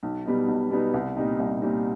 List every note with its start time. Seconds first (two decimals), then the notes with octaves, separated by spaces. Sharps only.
0.03 B1
0.26 B2 G3 B3 D#4
0.48 B1
0.71 B2 G3 B3 D#4
0.94 C2
1.17 A#2 G3 C4 D#4
1.40 C2
1.62 A#2 G3 C4 D#4